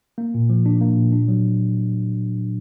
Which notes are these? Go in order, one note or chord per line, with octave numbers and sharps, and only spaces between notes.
A#3
A#2
F3
D4
A#3
A#2
D4
F#3